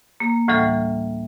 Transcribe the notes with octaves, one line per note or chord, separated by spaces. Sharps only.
A#3
D2 A2 E3 G3 A4 F6